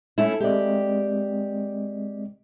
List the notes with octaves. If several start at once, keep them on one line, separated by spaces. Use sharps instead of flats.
A3 C#4 E4
G#3 C4 G4 D5 D#5